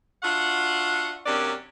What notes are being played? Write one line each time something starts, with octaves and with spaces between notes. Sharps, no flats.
D4 F4 F#4 E5 F#5
F#2 C3 A#3 C#4 D4 D5